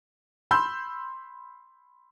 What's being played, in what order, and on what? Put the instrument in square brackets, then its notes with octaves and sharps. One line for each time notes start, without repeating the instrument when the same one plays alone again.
[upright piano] B5 C6 E6 G6